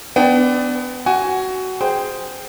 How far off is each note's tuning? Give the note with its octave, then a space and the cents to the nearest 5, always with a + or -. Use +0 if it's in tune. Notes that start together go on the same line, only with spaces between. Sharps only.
B3 +25 D4 +0 G5 +10
F#4 +15 G#5 +0
G#4 +0 C5 -15 G5 +0